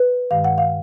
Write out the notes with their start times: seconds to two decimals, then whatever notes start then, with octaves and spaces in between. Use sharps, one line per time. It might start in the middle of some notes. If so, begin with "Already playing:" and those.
Already playing: B4
0.31 G2 D#3 G#3 F5
0.44 F#5
0.58 F5